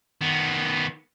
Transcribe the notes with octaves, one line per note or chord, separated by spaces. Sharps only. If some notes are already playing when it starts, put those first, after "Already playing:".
D#3 B3